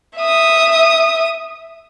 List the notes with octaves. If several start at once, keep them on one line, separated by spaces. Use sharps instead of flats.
E5 D#6